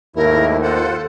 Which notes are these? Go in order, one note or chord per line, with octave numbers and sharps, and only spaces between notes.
D#2 G#2 A3 E4 A#4
F4 A4 C5 F#5